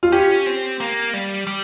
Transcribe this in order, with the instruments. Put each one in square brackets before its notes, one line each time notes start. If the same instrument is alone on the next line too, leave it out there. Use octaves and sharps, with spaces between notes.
[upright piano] F4
[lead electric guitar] C#4 [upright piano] G4
[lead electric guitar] C4
A#3
G3
G3